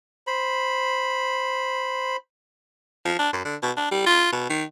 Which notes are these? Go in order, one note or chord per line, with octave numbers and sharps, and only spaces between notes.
C5 B5
F3
D4
F#2
D3
B2
D4
G3
F4
B2
D#3